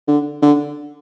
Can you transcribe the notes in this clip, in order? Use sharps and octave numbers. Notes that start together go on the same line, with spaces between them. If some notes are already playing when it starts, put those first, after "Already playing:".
D3
D3